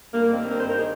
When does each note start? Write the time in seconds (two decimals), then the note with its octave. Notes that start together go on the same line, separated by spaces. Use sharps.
0.13 G2 A#3
0.31 D#3 C4
0.50 G2 A#4
0.59 C5
0.68 D#3 A#4
0.78 G#4